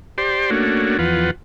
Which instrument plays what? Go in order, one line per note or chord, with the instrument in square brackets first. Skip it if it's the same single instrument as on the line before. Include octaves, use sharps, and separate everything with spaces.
[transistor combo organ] G4 C5 D5 C6
A3 A#3 C#4 D4 F#4
E2 F3 F4 B4 F#5